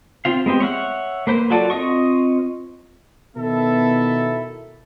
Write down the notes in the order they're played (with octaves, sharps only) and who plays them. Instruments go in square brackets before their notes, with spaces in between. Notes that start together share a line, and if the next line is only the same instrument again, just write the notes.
[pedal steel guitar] C4 F4 F5
G#3 B3 C4 G4
C#5 E5 F#5 F6
A#3 B4 C5
F#3 F4 F#4 A4 D5
C4 F4 D#5 C#6
[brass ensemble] B2 D#3 B3 E4 A4 E5